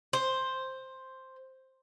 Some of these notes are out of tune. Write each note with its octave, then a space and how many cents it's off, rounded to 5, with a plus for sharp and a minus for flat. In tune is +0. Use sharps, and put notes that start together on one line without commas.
C5 +5